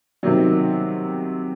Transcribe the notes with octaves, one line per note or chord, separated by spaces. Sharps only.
C3 D#3 F#3